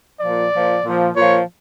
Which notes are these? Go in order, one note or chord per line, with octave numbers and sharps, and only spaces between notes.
A#2 F3 D5
A#2 F3
A#2 F3
A#2 F3 C#5